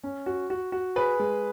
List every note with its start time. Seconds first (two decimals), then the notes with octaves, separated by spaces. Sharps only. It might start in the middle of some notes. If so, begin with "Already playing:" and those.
0.04 C#4
0.26 F#4
0.50 F#4
0.72 F#4
0.96 G#4 B4
1.19 G#3